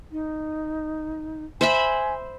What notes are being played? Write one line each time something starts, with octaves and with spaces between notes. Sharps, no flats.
D#4
C5 E5 G#5 B5